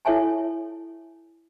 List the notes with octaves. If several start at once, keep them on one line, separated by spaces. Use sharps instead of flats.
E4 A4 C#5 E5 G#5 A5